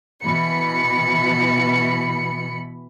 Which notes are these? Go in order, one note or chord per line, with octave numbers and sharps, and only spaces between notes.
B2 E3 B5 C#7